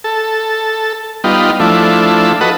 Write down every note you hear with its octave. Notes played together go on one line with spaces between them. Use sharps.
A4
G3 B3 D#4 F4
F3 A3 D4 E4
F#4 A4 B4 D#5